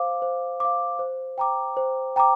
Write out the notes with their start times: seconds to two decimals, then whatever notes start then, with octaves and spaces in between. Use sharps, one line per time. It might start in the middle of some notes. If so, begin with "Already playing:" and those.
Already playing: C5 F5 D6
0.22 C5
0.60 F5 D6
0.99 C5
1.38 G5 A#5 D6
1.77 C5
2.16 G5 A#5 D6